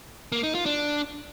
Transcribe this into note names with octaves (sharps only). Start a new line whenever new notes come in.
A#3
D#4
F4
D4